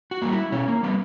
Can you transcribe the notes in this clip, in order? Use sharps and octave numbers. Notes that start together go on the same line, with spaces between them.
F#4
G3 A#3
E4
B2 C#4
A#3
G3 A#3 B3